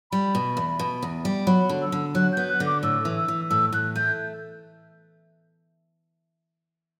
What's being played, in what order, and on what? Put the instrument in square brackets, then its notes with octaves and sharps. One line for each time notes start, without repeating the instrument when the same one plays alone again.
[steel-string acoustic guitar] G3 [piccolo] B5
[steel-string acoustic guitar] B2
E2
B2
E2
G3
[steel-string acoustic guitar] F#3 [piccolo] B5
[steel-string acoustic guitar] D3
[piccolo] E6
[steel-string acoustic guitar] D3
[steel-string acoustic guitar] F#3 [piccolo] F#6
[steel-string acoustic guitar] B3 [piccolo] G6
[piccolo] F#6
[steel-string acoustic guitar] D3
[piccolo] D6
[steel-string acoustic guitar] A2 [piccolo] E6
[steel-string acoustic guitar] E3
[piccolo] E6
[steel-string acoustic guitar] E3
[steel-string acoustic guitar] A2 [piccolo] E6
[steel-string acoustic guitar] A2 [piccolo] F#6
[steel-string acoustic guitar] A3 [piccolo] G6